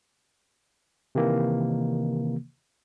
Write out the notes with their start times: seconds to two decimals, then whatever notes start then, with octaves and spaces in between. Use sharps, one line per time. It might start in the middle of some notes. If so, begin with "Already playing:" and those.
1.15 C3 D#3 E3 A#3